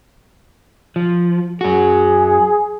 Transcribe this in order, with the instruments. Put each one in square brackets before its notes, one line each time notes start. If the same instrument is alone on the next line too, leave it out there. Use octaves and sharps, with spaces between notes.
[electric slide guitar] F3
[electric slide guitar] F#2 F#4 [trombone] G#4